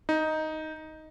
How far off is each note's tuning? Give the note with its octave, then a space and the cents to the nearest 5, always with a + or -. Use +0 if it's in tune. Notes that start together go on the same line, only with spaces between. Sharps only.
D#4 +5